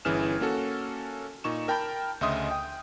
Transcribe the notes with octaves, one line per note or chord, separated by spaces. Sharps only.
G1 E3 C#4 G#4 F6 E7
A#3 C#4 F#4 A4
A#2 D#4 C#6 E7
A#4 G5 A5 B5 F6 G6
D2 C#3 D#5 E5 C6 D#6
G5